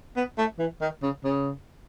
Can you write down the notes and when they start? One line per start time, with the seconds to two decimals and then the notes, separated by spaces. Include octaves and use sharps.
0.16 B3
0.38 A3
0.59 E3
0.81 D#3
1.02 C#3
1.24 C#3